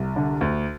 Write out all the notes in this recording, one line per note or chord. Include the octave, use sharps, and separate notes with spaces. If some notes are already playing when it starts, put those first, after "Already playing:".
Already playing: C2
D3
D2